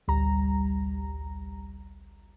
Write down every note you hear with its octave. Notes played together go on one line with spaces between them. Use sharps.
A1 D2 G3 A#5